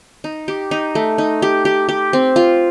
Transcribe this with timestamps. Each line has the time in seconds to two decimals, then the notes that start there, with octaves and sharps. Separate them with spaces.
0.24 D#4
0.48 G4
0.71 D#4
0.95 A3
1.18 D#4
1.42 G4
1.65 G4
1.89 G4
2.13 C4
2.36 F4